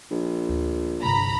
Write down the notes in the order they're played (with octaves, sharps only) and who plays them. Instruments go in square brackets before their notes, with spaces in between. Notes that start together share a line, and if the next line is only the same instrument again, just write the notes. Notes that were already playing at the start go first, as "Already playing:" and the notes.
[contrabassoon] A#1
[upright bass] D2
[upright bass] G1 C2 [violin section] A#5 B5